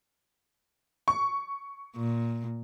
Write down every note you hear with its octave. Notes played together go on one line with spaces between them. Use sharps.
C#6
A#2